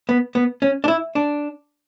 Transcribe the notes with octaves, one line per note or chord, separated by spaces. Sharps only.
B3
B3
C#4
D4
E4
D4